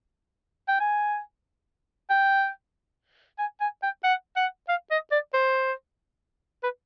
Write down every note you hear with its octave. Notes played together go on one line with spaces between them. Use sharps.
G5
G#5
G5
G#5
G#5
G5
F#5
F#5
F5
D#5
D5
C5
B4